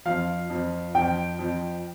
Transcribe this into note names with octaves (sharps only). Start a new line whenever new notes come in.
F2 F3 F5
F2 F3
F2 F3 G5
F2 F3